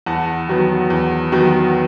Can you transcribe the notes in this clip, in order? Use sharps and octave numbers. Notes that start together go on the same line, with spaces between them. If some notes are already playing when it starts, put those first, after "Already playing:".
E2 F#5 A5
D#3 F#3 B3
E2
D#3 F#3 B3